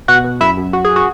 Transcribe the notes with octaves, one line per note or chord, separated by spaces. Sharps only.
B2 F#4 F#5
B2
F#2 E4 E5
F#2
F#2 F#4
G#4
F#4